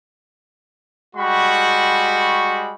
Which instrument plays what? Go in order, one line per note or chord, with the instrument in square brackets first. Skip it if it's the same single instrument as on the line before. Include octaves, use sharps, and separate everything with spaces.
[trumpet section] G3 G#3 F#4 G5 B5 C#6